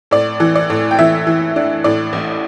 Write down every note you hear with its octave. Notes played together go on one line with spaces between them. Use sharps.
A2 D5
E3
D5
A2
G5
E3 E5
E3
D4
A2 D5
A1